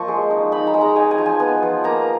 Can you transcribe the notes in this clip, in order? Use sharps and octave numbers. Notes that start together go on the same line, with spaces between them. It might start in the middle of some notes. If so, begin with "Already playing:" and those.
Already playing: F3 A#3 D#5 C#6
G#3
D#4
D#4 B5
A#5
G#3
A#5
D#4 G#5
G#5
F3
G#5
B3
F3
A#3 A#5